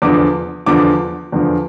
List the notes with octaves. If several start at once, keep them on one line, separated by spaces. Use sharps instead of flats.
E2 D3 F3 D6
E2 D3 F3 D6
E2 D3 F3